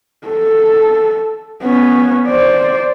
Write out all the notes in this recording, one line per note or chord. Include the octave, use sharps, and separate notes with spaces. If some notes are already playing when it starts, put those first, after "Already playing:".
A4
B3 C#4
C5 D5